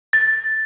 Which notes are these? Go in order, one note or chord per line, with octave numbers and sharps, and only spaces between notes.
A6